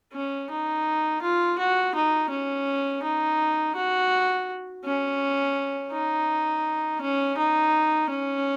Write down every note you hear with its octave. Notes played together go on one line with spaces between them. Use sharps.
C#4
D#4
F4
F#4
D#4
C#4
D#4
F#4
C#4
D#4
C#4
D#4
C#4